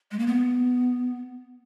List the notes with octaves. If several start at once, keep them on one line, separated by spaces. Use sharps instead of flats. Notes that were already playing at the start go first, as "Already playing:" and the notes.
G#3
A#3
B3